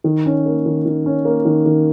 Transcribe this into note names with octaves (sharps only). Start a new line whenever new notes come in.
D#3
C#4
A#3
D#3
D#3
C#4
A#3
D#3
D#3